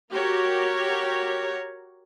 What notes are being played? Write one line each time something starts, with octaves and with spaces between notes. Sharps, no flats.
F#4 G4 A#4 C#5